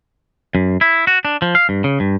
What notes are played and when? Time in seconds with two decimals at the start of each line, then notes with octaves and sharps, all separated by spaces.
0.55 F#2
0.81 E4
1.07 F#4
1.25 D4
1.42 F3
1.55 F5
1.69 G2
1.84 C#3
2.00 G2